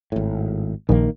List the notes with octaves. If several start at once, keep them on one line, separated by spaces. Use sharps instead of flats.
G#1 A2
A#1 D#3 A#3